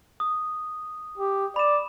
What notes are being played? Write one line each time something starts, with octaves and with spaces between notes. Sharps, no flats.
D#6
G4
D5 B5 E7